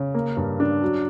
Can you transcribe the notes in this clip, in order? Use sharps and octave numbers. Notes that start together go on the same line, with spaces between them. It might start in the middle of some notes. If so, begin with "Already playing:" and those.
Already playing: C#3
A#3
G2
D4
F#3